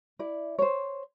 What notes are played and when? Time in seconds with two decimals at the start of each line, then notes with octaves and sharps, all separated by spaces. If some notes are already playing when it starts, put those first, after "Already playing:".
0.19 E4 D5
0.59 C5 C#5